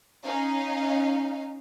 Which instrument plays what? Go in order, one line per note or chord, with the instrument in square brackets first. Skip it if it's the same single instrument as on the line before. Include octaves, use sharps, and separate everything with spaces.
[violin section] C#4 D#4 F5